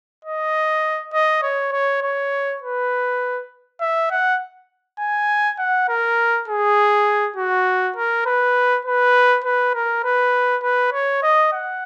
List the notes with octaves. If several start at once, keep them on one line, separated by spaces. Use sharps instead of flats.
D#5
D#5
C#5
C#5
C#5
B4
E5
F#5
G#5
F#5
A#4
G#4
F#4
A#4
B4
B4
B4
A#4
B4
B4
C#5
D#5
F#5